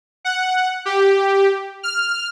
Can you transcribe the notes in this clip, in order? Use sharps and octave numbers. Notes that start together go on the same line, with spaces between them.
F#5
G4
F6